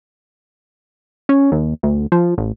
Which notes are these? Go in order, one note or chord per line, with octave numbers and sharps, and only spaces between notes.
C#4
D#2
D2
F3
A1